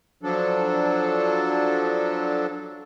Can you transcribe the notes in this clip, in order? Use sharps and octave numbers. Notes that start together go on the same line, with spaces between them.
F3 F#3 D4 A4